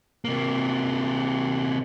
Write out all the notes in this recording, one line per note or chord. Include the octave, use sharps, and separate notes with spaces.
C3 A#3